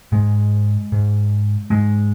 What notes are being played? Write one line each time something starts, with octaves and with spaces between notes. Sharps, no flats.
G#2 G#3
G#2
G#2 G#3